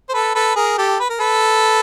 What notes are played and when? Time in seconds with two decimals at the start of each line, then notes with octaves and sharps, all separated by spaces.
0.09 C5
0.13 A4 B4
0.35 A4 B4
0.56 G#4 A#4
0.78 G4 A4
1.00 B4
1.10 A#4
1.20 A4 B4